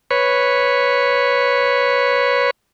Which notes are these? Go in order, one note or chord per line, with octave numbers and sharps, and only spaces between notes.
B4 C#5